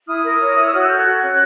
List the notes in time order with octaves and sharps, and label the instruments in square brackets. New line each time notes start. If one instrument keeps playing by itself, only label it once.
[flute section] E4 D#6 F6
A#4
C#5
E4
E6
F#4 D#6 F6
E6 F#6
A4 F6 G6
F#6 G#6
F#4
C#4